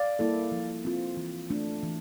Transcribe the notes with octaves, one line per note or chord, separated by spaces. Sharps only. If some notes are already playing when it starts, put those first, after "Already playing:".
Already playing: D5 F5
G3 A#3 E4 A4
F3
C4 F4
E3
A3 D4
E3